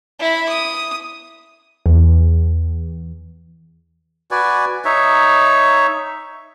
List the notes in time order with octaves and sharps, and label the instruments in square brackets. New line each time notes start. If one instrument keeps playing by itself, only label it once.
[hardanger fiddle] E4 B5
D#6
[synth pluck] E2
[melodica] F#4 B4 D5 G#5
D#4 C#5 E5